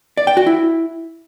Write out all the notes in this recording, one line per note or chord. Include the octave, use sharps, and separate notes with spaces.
D5
G5
F#4
E4